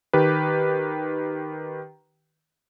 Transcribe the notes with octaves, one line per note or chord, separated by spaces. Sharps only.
D#3 G4 B4